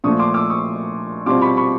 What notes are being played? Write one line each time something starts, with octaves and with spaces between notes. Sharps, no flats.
A#2 F3 A3 C#6 D#6
C6 D6
D6 E6
C#6 D#6
B2 G3 C4 F4 C6 D6
B5 C#6
B5 C#6